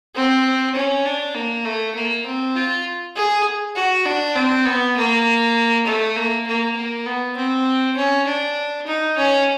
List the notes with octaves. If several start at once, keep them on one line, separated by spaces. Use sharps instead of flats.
C4
C#4
D4
A#3
A3
A#3
C4
F4
G#4
F#4
D4
C4
B3
A#3
A3
A#3
A#3
A#3
B3
C4
C#4
D4
D#4
C#4